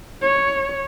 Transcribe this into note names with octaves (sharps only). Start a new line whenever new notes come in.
C#5